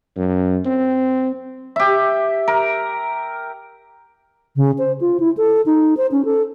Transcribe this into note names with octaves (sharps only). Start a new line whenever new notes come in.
F#2
C4
G4 E5
A#4
C#3
C5
F4
E4
A4
D#4
C5
C#4
A4